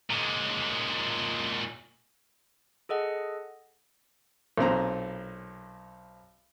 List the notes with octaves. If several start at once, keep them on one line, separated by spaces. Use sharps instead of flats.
A#2 G#3
G#4 A4 D#5 F#5
B1 A#2 C4 A#5